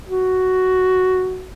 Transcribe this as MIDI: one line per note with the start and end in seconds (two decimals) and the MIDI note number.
0.09 1.50 66